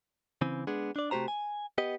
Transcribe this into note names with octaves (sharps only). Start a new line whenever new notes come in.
C#3 E3 C4
G#3 B3 D4 G#4
D4 D5
C3 A3 F#4 G4 C5 A#5
G#5
B3 G4 D#5